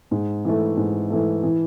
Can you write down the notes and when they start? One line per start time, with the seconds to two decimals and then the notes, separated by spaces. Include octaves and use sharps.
0.11 G#2
0.45 E3 A3
0.77 G#2
1.10 E3 A3
1.43 E3